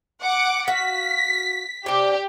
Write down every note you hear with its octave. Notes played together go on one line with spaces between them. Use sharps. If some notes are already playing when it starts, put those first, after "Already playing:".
F#5 D6
F#4 F5 B6
C3 D4 G4